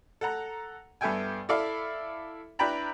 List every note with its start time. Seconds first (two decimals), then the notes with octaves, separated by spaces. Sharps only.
0.21 A4 F#5 A#5
1.01 G2 B3 A4 E5 G5 G#5
1.49 E4 A4 D5 E5 F5
2.59 D4 E4 B4 G5 A#5 B5